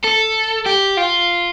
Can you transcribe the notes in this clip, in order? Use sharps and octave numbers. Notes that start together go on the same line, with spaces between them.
A4
G4
F4